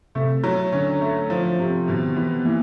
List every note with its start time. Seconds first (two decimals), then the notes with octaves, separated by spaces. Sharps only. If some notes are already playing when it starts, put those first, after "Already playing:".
0.15 C3 A3
0.44 F#3
0.72 D3 C#4
1.01 A3
1.30 F3
1.59 C3
1.88 B2 D#3
2.16 E3 B3
2.45 E3 A#3